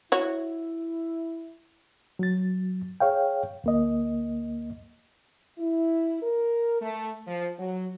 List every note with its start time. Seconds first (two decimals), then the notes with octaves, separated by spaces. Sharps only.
0.12 E4 F#4 C#5
2.19 F#3 A6
3.00 G#4 C#5 F5 G5
3.64 D2 A#3 D#5
5.59 E4
6.22 A#4
6.81 A3
7.26 F3
7.59 F#3